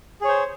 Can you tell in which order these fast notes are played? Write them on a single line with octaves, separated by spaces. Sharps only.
G#4 C#5 C5